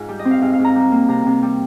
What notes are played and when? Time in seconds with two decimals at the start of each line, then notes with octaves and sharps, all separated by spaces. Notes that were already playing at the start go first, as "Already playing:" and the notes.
Already playing: G#2 F4
0.09 G3 G4
0.19 D#5
0.25 C4
0.31 F5
0.41 G#2 F5
0.53 F5
0.59 G#2
0.65 A#5
0.75 G3
0.92 A#3
1.09 C3 A#5
1.26 C3
1.43 G3